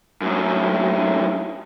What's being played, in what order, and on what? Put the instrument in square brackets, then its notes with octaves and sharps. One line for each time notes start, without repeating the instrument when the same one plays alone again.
[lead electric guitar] F#2 A2